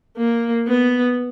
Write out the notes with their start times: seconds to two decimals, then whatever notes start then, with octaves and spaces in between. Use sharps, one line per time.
0.17 A#3
0.67 B3